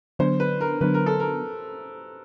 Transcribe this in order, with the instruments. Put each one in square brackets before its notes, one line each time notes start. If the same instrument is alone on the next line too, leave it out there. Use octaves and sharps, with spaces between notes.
[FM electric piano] D3 F#3 B3 D4 [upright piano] C5
[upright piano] B4
A#4
[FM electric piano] D3 F#3 B3 D4 [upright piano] B4
[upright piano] A#4
A4
A#4